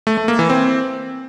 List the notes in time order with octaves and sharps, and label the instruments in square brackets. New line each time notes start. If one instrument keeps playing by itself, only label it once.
[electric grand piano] A3
A3
A#3
E3
C4